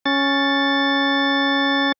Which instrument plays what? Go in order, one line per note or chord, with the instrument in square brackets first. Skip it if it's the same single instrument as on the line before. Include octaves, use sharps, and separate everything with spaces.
[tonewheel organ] C#4 A6